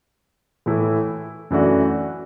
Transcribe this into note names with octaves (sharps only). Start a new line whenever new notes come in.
A2 E3 A3 E4
F#2 E3 A3 D4 F#4